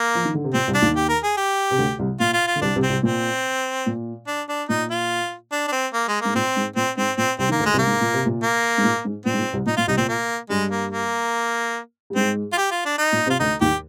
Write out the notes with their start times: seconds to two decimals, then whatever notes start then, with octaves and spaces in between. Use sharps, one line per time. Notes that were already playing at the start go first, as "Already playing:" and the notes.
Already playing: A#3
0.15 F3
0.25 D#3
0.34 D3
0.44 C3
0.54 A#2 C4
0.67 C2 C3
0.74 D4
0.82 D#2 D#3
0.96 G4
1.09 A#4
1.23 G#4
1.37 G4
1.71 C3
1.78 D2 D3
1.99 C2 C3
2.20 A#2 F4
2.33 F4
2.47 F4
2.56 D3
2.61 C2 C3 D4
2.75 C2 C3
2.83 C4
2.89 C2 C3
3.03 A#2 C4
3.86 A#2
4.27 D4
4.49 D4
4.69 A#2 D#4
4.90 F4
5.52 D4
5.67 D4
5.72 C4
5.93 A#3
6.08 G#3
6.21 G#2 A#3
6.35 A#2 C4
6.56 G#2
6.76 A#2 C4
6.97 G#2 C4
7.17 A#2 C4
7.39 C2 C3 C4
7.49 D#3 A#3
7.59 D2 D3
7.66 G#3
7.73 C2 C3
7.78 A#3
7.87 G#2
8.01 A#2
8.14 C3
8.26 A#2
8.43 A#3
8.78 G#2
8.84 A#2
9.05 G#2
9.25 A#2 C4
9.33 G#2
9.39 A#2
9.53 C2 C3
9.66 A#2 D#4
9.77 A#2 F4
9.87 C2 C3 D#4
9.97 A#2 C4
10.08 A#3
10.50 G2 G3 G#3
10.71 A#3
10.91 A#3
12.10 G3
12.16 G#2 G#3 C4
12.52 F4
12.58 G4
12.71 F4
12.85 D4
12.98 D#4
13.12 A#2 A#3
13.26 C3 C4
13.30 F4
13.40 D2 D3 D#4
13.61 D#2 D#3 G4